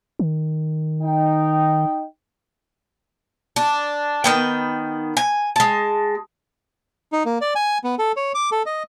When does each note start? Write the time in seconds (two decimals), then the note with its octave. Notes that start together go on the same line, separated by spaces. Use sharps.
0.19 D#3
1.03 D#4 G5
3.56 D4
4.24 D#3 B3 G5
5.17 G#5
5.56 G#3 A5
7.12 D#4
7.25 A#3
7.41 D5
7.55 G#5
7.84 B3
7.99 A4
8.17 C#5
8.35 D6
8.52 A4
8.66 D#5